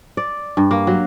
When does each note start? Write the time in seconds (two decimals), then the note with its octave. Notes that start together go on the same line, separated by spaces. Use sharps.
0.17 D5
0.57 G2
0.71 A#3
0.87 F#3